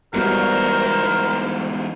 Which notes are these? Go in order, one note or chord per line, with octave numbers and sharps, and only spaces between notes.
E2 G#2 G3 B3 F#4 A#4 C5